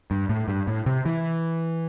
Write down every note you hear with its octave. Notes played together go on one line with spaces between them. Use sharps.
G2
A2
G2
A2
C3
E3